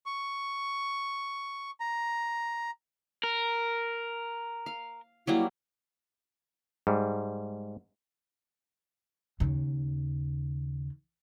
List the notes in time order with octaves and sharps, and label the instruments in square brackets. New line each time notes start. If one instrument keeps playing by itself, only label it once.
[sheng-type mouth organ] C#6
A#5
[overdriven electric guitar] A#4
[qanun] F5
[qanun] F#3 G3 A#3 [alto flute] E4
[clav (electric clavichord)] G#2 G3
[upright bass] D#2 C#3